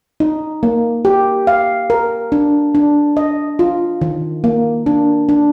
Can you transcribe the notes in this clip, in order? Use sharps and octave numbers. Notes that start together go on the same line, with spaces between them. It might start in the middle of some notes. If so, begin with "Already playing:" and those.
D#4
A#3
G4
F5
A#4
D4
D4
D#5
F4
D#3
A#3
D4
D4